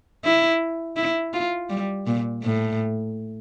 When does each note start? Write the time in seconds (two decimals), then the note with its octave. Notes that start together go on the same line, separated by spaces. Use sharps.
0.24 E4
0.96 E4
1.33 F4
1.70 G3
2.06 A#2
2.43 A2